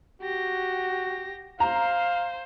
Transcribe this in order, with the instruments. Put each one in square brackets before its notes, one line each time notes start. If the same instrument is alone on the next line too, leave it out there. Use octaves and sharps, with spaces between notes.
[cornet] F#4 [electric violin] G4 A#6
[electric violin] C5 [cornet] F5 [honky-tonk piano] A#5